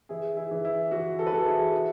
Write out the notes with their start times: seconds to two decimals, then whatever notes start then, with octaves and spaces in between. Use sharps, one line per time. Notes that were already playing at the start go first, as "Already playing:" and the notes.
0.09 E3 E4 G#4
0.37 E4 G#4
0.51 E3
0.65 E4
0.91 E3 F#4
1.19 A4
1.26 B4
1.32 E3 F#4 A4
1.46 E4 G#4
1.73 E4